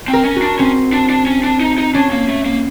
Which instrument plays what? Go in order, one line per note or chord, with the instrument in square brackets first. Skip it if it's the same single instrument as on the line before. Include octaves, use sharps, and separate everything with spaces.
[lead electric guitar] C4
[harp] A#4
[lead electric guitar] C#4
[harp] F#4
[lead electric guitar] D4
[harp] C4 [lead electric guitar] C#4
[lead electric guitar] D4
D4
C#4
D4
D#4
D#4
[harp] C#4 [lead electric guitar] D4
[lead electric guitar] A#3
A3
A#3